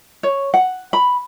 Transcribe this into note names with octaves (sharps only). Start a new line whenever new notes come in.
C#5
F#5
B5